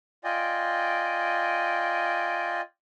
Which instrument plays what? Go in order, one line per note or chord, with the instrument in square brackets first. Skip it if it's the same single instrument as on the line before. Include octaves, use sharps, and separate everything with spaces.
[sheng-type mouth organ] F4 D5 D#5 G5 G#5